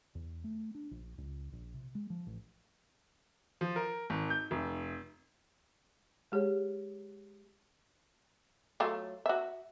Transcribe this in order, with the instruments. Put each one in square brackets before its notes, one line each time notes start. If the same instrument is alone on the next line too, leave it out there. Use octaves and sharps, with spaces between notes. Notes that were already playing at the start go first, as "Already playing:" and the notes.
[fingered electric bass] E2
A3
D4
A#1
C#2
A#1
C3
G#3
F3
A1
[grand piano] F3
A#4
G#1
G6
F1
[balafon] G#3 G4 G#4 C#5
[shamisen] F#3 A3 F4
F#4 E5